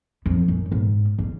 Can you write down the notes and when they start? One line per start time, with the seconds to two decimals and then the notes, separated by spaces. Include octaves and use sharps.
0.26 F2
0.48 F#2
0.72 G#2
1.18 C#3